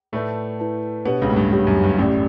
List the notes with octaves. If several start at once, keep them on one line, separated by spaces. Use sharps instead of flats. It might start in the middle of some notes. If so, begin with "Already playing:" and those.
A2 A3 E4 B4 D5 A5
E4 B4 D5 A5
B2 B3 D4 G4 C#5
C#2 C#3
A2
G2
G2 D4 G4 C#5
F#2
G2
A1 A2 C#4 G4 D5